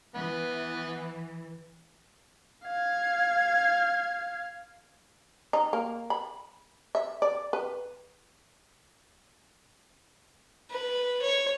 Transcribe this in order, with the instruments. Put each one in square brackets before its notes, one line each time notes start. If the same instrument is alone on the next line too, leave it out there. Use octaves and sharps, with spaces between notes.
[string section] E3 [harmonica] B3
[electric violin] F5 G#6
[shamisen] D#4
A#3
B5
E5
D5
B4
[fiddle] B4
C#5